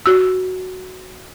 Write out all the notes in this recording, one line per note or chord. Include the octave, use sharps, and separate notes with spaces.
F#4 E6